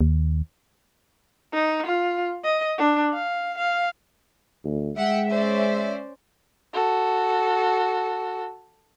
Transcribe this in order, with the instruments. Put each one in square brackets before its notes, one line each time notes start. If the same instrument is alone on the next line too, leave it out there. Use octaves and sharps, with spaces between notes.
[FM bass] D#2
[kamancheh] D#4
F4
D#5
D4
F5
F5
[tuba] D2
[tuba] G#3 [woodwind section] E5 [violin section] F#5 G5
[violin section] C#4 C5 D5
[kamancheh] F#4 A4